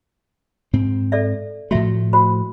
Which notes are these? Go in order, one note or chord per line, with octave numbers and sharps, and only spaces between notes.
G#2 C4
A4 D5 E5
A2 F3 A3 F#4 E5
F#4 C5 B5